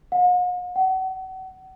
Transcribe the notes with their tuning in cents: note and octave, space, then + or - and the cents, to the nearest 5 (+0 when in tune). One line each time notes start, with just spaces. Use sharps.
F#5 -45
F#5 +35